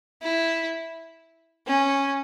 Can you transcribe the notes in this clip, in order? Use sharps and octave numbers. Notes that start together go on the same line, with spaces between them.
E4
C#4